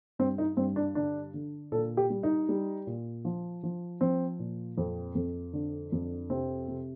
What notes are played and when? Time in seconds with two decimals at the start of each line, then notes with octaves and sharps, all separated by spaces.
0.19 G2 C4
0.38 D#4
0.57 G2 C4
0.76 D4
0.95 D3 D4
1.34 D3
1.72 A#2 A4
1.97 G4
2.10 G3
2.23 D#4
2.49 G3
2.87 A#2
3.25 F3
3.63 F3
4.01 F3 C4
4.39 A#2
4.77 F2 C4
5.15 F2
5.53 D3
5.92 F2
6.30 C3 C4
6.68 C3